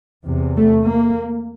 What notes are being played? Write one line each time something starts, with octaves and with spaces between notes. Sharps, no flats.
E2 C3
A3
A#3